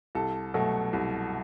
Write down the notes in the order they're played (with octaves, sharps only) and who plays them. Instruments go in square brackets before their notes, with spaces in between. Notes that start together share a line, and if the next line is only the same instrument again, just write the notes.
[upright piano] C2 A4
B2 F#3 A3
C2